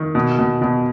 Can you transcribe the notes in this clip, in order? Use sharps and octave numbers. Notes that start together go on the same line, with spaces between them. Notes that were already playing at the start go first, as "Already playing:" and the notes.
Already playing: D#3
B2
B2
B2